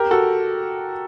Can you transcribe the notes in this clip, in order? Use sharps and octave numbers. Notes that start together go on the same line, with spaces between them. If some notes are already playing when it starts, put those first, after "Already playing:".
Already playing: G4 A#4
F#4 A4